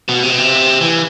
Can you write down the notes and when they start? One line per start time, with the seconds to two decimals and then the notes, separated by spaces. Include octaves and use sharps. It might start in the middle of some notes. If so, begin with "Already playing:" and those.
0.09 B2
0.23 C3
0.30 B2
0.38 C3
0.81 E3